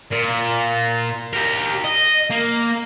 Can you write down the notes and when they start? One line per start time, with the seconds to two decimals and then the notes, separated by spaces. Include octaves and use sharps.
0.11 A#2
1.33 G4 A#4
1.85 D#5
2.30 A#3